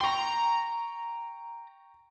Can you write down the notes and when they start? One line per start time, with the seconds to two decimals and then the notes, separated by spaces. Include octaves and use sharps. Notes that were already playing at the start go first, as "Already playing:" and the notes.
0.01 G5 A#5 C6 C#6